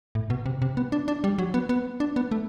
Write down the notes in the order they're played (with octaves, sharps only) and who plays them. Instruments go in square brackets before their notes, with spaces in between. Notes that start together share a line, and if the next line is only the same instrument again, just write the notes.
[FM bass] A2
B2
C3
C3
B3
D4
D4
G3
F#3
B3
B3
D4
B3
A3